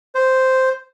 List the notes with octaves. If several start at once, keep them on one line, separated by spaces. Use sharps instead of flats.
C5